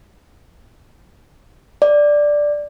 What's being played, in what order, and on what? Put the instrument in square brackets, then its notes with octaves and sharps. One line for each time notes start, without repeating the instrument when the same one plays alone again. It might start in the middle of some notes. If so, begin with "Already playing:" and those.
[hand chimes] D5